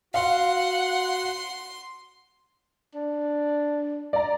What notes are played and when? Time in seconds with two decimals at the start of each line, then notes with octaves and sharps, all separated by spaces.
0.14 F#4 F5 F#5 C6
2.95 D4
4.13 D5 A#5